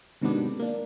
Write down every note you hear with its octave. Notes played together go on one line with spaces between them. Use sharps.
G#2 C3 D#3 F#3 B3 D4
A#3 D4